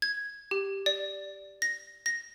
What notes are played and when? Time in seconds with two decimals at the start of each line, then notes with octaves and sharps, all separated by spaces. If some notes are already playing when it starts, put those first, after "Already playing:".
0.02 G#6
0.51 G4
0.86 D5
1.62 A#6
2.06 A#6